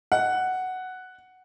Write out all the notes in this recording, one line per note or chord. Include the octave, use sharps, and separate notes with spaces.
F#5